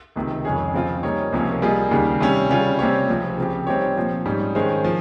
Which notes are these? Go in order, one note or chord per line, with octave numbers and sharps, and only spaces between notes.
C#2 C3 D#3
F2 C#3 G#3 C#4 G#4
C#3 F3 C4 F4
G3 A#3 D#4 A#4 C#5
C#2 C3 F3 A#3 C#4
G3 A#3 F4 G#4 D#5
D#2 C#3 G3
C3 G3 C#4
C#3 G3 C#4 F4
C3 G3 C4 G4 C#5
C#2 C3 F3 C4
C#3 F3 C4 G4
G3 C4 D#4 G4 C#5
A#2 F3 C4
G#2 G3 C#4
D#3 G#3 C#4 G#4 C5
F3